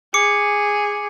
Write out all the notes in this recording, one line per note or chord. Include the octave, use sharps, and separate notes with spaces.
G#4 D6 C#7